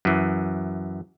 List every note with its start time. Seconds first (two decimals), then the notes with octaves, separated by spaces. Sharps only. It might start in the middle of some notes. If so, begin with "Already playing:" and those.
0.05 F#2 E3